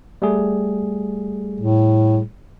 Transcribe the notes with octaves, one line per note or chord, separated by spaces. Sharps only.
G3 A3 G#4
A2